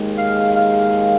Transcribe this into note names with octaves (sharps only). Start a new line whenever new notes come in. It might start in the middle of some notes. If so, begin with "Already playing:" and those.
Already playing: D#2 D#3 G#3
F5
F5